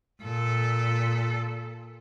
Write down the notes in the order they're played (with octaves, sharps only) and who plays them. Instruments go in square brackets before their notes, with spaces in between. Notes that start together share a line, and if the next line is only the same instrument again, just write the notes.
[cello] A#2 A4